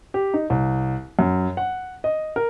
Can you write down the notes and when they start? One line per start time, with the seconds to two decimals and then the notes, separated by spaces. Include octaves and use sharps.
0.14 G4
0.34 D#4
0.50 C2
1.19 F#2
1.57 F#5
2.04 D#5
2.36 A#4